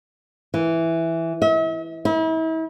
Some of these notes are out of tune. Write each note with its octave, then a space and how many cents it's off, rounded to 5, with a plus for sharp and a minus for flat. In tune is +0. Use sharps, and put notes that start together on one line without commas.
E3 +0
E5 -45
E4 -40